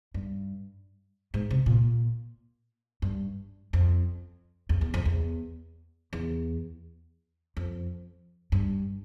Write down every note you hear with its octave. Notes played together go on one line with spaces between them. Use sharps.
G2
G#2
C3
A#2
G2
F2
E2
E2
F2
E2
E2
F2
G2